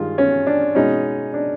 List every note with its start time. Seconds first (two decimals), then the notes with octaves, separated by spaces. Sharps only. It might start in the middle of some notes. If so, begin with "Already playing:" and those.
Already playing: G2 D#3 G#3 F4
0.18 C#4
0.47 D4
0.75 B2 G#3 C#4 D#4
1.34 D4